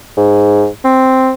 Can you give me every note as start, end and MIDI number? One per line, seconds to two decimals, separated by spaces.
0.17 0.68 44
0.84 1.33 60